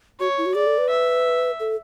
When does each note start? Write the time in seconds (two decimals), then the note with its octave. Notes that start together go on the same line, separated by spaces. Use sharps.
0.20 F#4 C#5
0.38 E4
0.46 F#4
0.55 G#4 D5
0.67 A4
0.78 B4
0.90 E5
1.60 A4